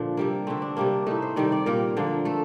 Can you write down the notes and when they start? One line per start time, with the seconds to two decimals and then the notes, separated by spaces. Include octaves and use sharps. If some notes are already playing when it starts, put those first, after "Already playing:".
Already playing: A#2 D3 F3 D4
0.17 C3 G3 A#3
0.47 D3 A3 C4
0.62 D4
0.77 C3 G3 A#3 D4
1.06 A2 A3 D#4
1.22 C5
1.36 C3 D#3 G3 D5
1.52 D5
1.66 A#2 G3 A#3 A#4
1.97 D3 F3 A#3
2.25 A3 A4